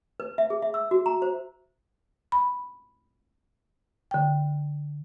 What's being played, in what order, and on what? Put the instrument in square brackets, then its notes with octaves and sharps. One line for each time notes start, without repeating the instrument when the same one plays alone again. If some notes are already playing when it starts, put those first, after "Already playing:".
[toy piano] B4
E5
G#4
E5
E6
F#4
A#5
C5
[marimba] B5
D3 G5